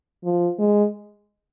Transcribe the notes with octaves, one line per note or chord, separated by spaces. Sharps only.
F3
G#3